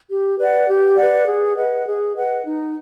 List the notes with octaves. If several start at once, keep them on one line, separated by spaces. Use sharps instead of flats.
G4
B4 D5 F#5
G4
B4 D5 F#5
G#4
B4 D#5 F#5
G#4
B4 D#5 F#5
D#4